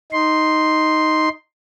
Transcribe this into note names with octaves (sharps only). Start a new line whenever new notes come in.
D#4 C6